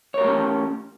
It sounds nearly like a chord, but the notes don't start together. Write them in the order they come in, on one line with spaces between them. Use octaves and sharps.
C#5 A#4 G4 A3 C#4